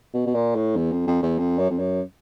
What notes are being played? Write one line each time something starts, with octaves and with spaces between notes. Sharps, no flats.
B2
B2
A#2
A2
E2
F2
F2
E2
F2
F#2
F2
F#2